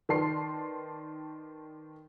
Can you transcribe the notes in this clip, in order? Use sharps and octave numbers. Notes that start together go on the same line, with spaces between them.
D#3 B4 D5 A5 C6 C7